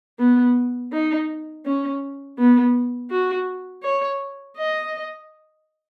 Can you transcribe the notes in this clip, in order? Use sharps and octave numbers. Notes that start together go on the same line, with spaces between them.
B3
D#4
C#4
B3
F#4
C#5
D#5